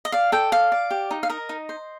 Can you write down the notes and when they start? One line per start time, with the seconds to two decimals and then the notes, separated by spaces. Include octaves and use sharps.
0.05 D#5
0.12 D5 F5
0.32 A4 G5
0.52 D5 F5
0.72 D5
0.91 G4
1.11 D#4
1.23 F5
1.30 A#4 D#5
1.49 D#4
1.69 C5